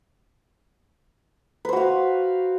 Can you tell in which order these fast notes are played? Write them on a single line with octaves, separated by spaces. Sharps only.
B4 C5 F#4 F5